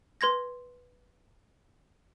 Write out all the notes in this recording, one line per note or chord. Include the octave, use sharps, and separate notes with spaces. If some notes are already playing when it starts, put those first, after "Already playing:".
B4 C6 G#6 A#6